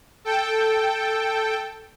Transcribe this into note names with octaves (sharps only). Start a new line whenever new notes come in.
A4 G5